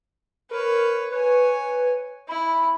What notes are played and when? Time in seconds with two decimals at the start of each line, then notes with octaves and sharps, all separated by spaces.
0.51 A#4 B4 C#5
1.12 B4 C#5 G#5
2.29 E4 B5